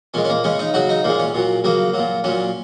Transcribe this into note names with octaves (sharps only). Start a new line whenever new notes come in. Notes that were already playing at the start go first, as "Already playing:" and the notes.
A#2 G#3 C#4
C#4
A#3
C#3 G#3 C#4
D#4
C#3 F#3 F#4
D#4
A#2 G#3 A#3
C#4
A#2 F#3
C#3 F#3 A#3
A#2 F#3
A#2 F#3 C#4